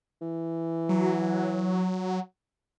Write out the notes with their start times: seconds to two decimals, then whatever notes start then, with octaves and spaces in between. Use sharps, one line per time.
0.21 E3
0.89 F#3